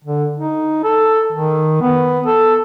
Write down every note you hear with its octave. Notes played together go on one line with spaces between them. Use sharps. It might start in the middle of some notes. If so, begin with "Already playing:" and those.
D3
D#4
A4
D#3
B3
A4